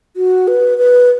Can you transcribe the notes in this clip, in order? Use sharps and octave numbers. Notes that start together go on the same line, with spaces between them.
F#4
B4
B4